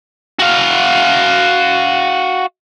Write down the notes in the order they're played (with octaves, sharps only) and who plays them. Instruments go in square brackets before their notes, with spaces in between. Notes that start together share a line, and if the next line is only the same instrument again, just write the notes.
[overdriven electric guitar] F#4 F5